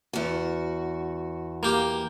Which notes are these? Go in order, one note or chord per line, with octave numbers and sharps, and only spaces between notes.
E2 F#4
A#3 G4